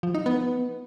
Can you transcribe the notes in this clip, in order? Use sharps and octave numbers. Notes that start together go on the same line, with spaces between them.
F3
D#4
B3